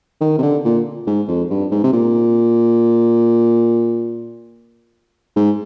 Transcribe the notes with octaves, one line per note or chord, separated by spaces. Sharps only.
D#3
C3
D3
A#2
G#2
F2
G2
G#2
C3
A#2
G#2